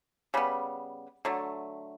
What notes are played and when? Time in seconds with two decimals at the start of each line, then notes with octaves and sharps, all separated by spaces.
0.34 C#3 G3 B3
1.25 D3 F#3 A3